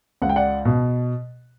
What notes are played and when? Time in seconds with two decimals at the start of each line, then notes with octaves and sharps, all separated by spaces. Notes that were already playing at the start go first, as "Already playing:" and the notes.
0.22 C#2 F#5
0.29 G5
0.36 D5 F#5
0.65 B2